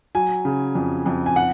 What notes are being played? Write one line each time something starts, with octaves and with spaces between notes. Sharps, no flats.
F#3 G#5
C#3
F2
F2
G#5
F#5